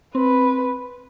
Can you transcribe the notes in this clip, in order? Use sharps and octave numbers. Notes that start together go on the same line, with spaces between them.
C4 B4